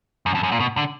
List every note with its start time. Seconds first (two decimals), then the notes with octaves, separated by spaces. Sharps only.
0.26 F#2
0.35 F2
0.43 F#2
0.52 A#2
0.60 B2
0.77 D3